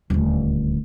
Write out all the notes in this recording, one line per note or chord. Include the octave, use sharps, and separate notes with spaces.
D#1 D2